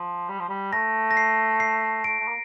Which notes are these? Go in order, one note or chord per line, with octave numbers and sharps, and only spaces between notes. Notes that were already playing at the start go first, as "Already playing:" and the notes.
Already playing: F3
G3
F3
G3
A3 A#6
A#6
C7
C7
A3 D7
A3
A#3